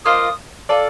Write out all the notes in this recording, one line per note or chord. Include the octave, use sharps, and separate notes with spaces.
A#3 F4 C5 D#5 D#6
F4 A4 D5